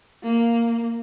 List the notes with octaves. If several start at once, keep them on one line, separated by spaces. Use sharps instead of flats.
A#3